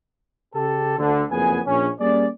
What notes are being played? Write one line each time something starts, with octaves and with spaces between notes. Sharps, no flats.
C#3 G4 A4
D2 D3
F#1 F2 A#3 B3 G#4 G#5
A#1 C#4
G3 A#3 C#4 G#4 D5